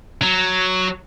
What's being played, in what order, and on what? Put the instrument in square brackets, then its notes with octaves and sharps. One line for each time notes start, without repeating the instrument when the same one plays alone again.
[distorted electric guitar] F#3